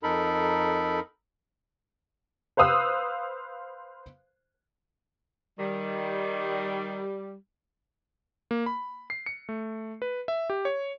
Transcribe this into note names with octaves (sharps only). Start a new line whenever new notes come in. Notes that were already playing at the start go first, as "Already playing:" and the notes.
F2 D#4 A4 A#4 B5
B4 C5 F5 D#6 E6 F#6
D#3 G3
A#3
B5
C7
C#7
A3
B4
E5
G4
C#5